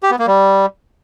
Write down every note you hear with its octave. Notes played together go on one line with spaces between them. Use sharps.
G4
B3
A#3
G3